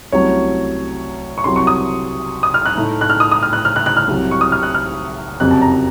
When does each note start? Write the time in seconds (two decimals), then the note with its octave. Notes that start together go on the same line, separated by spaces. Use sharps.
0.12 C2 C3 F#3 A3 C#4 C#5
1.38 C#6
1.44 C2 C3 F#3 C6
1.56 C#6
1.67 D#6
2.43 D#6
2.54 F6
2.66 F#6
2.76 A2 A3 D#4
3.01 F#6
3.10 F6
3.20 D#6
3.31 D#6
3.43 F6
3.53 F#6
3.65 F6
3.76 F#6
3.86 F#6
3.97 F6
4.08 C2 C3 F#3
4.31 C#6
4.41 D#6
4.52 F6
4.63 F#6
4.74 F6
5.40 F#1 F2 C3 F#3 F#6
5.51 A5
5.62 A#5